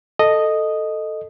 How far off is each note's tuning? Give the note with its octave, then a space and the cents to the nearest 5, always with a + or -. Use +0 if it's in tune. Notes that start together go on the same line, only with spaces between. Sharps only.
A4 +5 D#5 -5